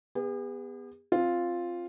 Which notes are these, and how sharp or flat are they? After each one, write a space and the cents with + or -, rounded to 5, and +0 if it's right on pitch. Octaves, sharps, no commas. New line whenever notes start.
B3 +0 G#4 -45
C4 +15 F4 +0